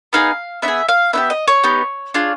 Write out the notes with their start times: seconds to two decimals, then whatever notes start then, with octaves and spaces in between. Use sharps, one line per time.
0.13 B3 D#4 G#4 F5
0.62 B3 D#4 E5
0.68 G#4
0.89 F5
1.13 B3 D#4 G4 E5
1.30 D#5
1.48 C#5
1.63 B3 D#4 G4
2.14 D4 F4 G#4